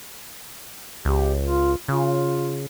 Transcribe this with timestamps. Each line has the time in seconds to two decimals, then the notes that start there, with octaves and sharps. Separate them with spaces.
1.05 C#2 G4
1.41 F4
1.88 C#3 F4